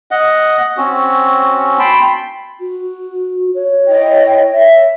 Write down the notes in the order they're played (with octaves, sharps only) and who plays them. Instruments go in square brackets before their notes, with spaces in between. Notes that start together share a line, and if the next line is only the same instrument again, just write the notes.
[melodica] D#5 F#5
C4 C#4 F#4
G5 A5 B5 C6
[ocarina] F#4
C#5
[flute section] E4 D#5 G5
E5